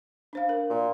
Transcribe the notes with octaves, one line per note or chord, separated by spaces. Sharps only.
D4 C5 F5
A#4
A#2